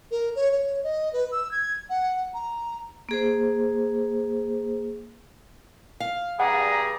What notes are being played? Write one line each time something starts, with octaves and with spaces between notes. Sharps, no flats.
A#4
C#5
C#5
D#5
B4
E6
G#6
F#5
A#5
A#3 G#4 C5
F5
G2 G#4 D5 F#5 A#5